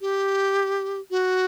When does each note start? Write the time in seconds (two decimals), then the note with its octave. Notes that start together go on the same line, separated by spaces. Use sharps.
0.01 G4
1.11 F#4